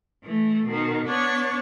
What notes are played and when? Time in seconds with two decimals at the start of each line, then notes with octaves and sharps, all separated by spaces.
0.22 E3 A3
0.65 B2 D#3
1.06 B3 D4 C#5